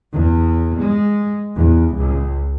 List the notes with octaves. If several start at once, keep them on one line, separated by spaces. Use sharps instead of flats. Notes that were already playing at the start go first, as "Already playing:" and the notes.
E2
G#3
E2
C#2